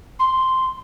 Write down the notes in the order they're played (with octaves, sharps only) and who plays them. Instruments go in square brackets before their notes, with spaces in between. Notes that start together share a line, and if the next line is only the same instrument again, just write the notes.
[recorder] C6